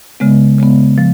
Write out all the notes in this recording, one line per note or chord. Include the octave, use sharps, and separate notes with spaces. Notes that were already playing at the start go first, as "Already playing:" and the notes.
C#3 G#3 B3
C#3 G#3 B3
F3